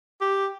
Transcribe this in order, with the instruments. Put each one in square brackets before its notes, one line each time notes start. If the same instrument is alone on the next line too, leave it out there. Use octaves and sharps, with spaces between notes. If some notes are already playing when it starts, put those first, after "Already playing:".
[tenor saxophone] G4